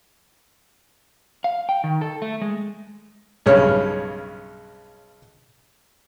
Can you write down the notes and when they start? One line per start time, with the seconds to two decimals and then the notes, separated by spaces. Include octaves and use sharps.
1.44 F5
1.69 G5
1.84 D#3
2.01 A4
2.22 A3
2.42 G#3
3.46 B1 G2 C#3 C#5 F6